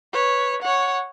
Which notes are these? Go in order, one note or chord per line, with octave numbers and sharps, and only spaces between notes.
B4 C#5
C#5 F#5